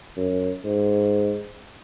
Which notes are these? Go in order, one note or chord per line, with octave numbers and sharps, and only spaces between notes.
F#2
G#2